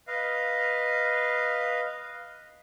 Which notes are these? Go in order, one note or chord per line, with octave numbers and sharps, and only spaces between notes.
B4 D#5 F5